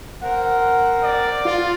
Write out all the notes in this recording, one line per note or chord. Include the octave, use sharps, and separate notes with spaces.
C4 A#4 F#5
D5
F4